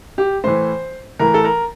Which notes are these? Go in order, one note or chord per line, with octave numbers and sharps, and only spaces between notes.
G4
A2 E3 C5
A2 E3 A#4
A4
A#4